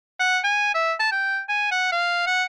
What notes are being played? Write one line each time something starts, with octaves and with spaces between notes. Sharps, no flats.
F#5
G#5
E5
A5
G5
G#5
F#5
F5
F#5